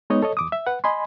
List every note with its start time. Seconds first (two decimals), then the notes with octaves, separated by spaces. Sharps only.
0.10 G#3 B3 D#4 C#5 D#5
0.22 A4 C#5 D#5
0.37 E2 D6 D#6
0.52 E5
0.67 B4 F#5
0.84 D#5 G#5 B5 C6